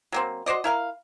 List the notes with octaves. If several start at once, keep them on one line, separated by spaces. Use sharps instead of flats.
F#3 A#3 C4
F#4 C5 D5 D#5
E4 A#4 F5